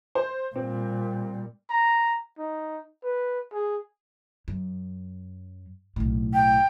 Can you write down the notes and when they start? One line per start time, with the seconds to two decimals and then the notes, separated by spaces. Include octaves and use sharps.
0.15 C5
0.56 A#2 G3 C4
1.70 A#5
2.38 D#4
3.03 B4
3.53 G#4
4.48 F#2
5.96 B1 A2
6.34 G5